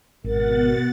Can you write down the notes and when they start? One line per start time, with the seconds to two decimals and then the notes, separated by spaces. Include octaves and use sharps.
0.24 G#1 B2 A#4 F#5 A6